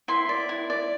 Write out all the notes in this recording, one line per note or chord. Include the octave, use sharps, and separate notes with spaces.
E4 C6
D5
E4
D5